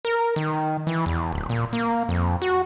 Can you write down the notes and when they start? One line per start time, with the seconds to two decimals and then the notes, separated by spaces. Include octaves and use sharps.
0.05 A#4
0.36 D#3
0.87 E3
1.06 E2
1.32 D1
1.49 A#2
1.73 A#3
2.09 F2
2.42 F#4